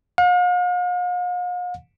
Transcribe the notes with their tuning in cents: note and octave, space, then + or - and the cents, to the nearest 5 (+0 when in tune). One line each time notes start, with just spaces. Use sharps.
F5 +45